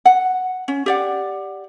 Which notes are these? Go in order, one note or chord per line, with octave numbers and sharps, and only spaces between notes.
F#5
C#4
G4 D5 F#5